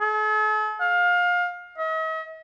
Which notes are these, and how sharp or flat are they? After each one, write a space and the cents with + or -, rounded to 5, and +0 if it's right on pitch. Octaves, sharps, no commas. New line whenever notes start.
A4 -45
F5 +25
D#5 +45